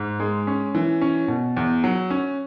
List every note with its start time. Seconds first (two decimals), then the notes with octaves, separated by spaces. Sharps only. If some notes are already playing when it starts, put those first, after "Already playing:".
Already playing: G#2
0.20 G#3
0.47 C#4
0.75 E3
1.01 C#4
1.28 B2
1.57 E2
1.84 F#3
2.10 C#4